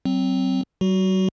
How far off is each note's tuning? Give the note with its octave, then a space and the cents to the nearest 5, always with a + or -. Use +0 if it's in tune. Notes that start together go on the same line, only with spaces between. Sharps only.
F#3 +30 C4 +0
F#3 +45 F#4 +5